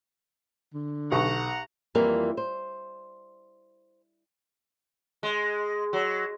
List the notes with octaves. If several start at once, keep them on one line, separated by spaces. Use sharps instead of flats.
D3
B1 G4 F#5 A5 A#5 C#6
F2 E3 G3 A#3 F4 A#4
C5
G#3
F#3